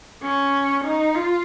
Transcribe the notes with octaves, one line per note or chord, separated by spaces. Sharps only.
C#4
D#4
F4